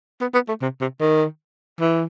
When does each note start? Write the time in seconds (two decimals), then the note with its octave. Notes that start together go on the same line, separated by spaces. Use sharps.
0.21 B3
0.34 B3
0.48 A3
0.62 C3
0.81 C3
1.00 D#3
1.80 E3